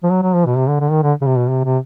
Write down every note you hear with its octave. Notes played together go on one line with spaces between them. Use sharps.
F3
F#3
F#3
F3
B2
C3
D3
D3
D#3
D3
C#3
C3
B2
C3
C3